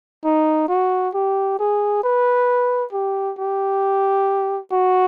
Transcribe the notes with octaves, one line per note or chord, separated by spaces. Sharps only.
D#4
F#4
G4
G#4
B4
G4
G4
F#4